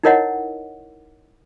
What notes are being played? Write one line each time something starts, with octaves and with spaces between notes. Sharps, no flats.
D#4 E4 A#4 C#5 D#5 F#5